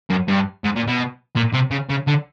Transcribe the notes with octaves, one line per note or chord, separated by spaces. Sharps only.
F#2
G2
G#2
A#2
B2
A#2
C3
C#3
C#3
D3